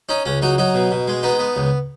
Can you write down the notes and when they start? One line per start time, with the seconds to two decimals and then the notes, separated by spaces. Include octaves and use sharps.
0.09 C#4 D#4
0.25 C#2 C#4
0.42 F#3 D#4
0.58 F#3 D#4
0.74 B2
0.91 B2
1.08 G#3
1.23 B3 D#4
1.39 B3
1.56 C#2